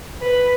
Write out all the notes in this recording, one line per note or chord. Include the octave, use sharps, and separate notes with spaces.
B4